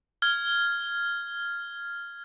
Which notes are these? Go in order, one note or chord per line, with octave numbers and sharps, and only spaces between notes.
F6 G#6 G7